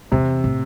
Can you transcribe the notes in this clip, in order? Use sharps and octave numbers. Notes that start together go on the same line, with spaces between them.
E2 C3
A2